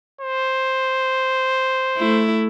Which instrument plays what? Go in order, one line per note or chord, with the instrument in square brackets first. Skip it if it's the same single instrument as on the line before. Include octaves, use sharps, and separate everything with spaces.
[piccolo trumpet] C5
[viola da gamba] A3 E4